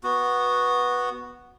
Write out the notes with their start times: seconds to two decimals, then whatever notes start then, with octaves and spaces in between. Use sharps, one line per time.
0.04 B3 F#4